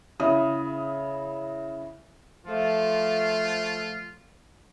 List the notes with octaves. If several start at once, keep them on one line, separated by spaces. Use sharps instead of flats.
C#3 E4 D#6
F3 A3 F4